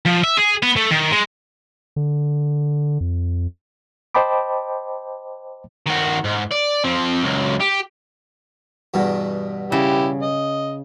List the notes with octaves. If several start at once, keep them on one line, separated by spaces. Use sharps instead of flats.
F3
E5
G#4
B3
A3
D#3
G#3
D3
F2
C5 D#5 G5 A5 B5 D6
D#3 F#4
G#2
D5
F3 C4
C#2 F#3
G4
E2 G2 B2
C#3 E4 G4
D#5